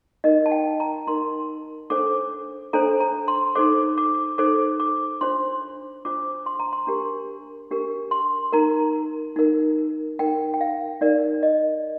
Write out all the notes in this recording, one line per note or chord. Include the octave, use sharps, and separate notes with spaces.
D#4 A#4 D#5
A5
G5
A#5
D#4 A#4 C6
D4 A4 C5 D6
D4 A4 C5 A#5
A#5
C6
D#4 A4 C5 D6
D6
D#4 A4 C5 D6
D6
D4 F4 C5 C6
D4 F4 C5 D6
C6
A#5
C6
D4 G4 A#4
D4 G4 A#4
C6
D#4 A#4 A#5
D#4 A#4
D#4 A#4 G5
G5
F5
D#4 A#4 D5
D#5